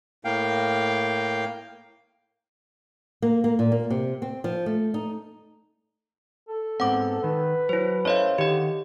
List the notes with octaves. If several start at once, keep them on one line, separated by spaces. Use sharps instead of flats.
A2 A#3 F5 G5
A#3
A#3
A#2
A#3
C3
C4
F3
A3
D#4
A4
G#2 B3 C4 F#5 D6
D#3 B4
F#3 E4 C5
C#4 E4 A4 C5 C#5 D#5 F5
D3 D#3 G4 D#5